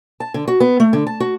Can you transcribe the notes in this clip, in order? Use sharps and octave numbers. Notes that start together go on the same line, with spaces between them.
A5
D3
F#4
B3
A3
D3
A5
F#4